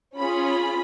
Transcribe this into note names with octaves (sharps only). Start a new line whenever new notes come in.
C#4 F4 G#4 B5
B5